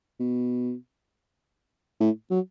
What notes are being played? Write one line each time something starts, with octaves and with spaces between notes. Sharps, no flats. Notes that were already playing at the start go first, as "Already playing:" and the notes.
B2
A2
F#3